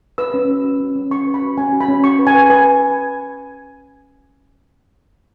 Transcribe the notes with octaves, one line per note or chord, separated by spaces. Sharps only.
B4 E6
C#4
F#4
F#4
C#4
C#4
C#4 C#6
B4
B5
F#4
C#4 G#5
F#4
B5
C#4
F#4 C#6
B4
G#5
B4
B4 G#5